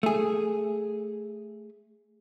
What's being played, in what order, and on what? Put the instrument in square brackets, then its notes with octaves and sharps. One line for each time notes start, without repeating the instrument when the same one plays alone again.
[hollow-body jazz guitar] A3 G#4